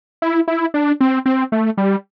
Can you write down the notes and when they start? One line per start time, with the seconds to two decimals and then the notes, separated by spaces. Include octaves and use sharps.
0.22 E4
0.48 E4
0.74 D4
1.01 C4
1.26 C4
1.52 A3
1.78 G3